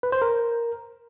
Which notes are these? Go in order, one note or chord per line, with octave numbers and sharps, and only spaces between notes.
B4
C5
A#4